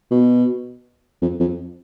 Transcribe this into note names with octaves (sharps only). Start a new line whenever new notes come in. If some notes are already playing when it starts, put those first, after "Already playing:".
B2
F2
F2